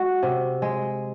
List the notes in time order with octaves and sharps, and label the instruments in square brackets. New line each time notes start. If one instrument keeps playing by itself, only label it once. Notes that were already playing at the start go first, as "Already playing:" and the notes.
Already playing: [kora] G#3 F#4
C3
G#3